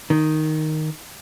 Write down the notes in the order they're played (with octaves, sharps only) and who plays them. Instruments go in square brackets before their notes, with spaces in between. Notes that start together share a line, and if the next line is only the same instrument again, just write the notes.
[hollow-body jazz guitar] D#3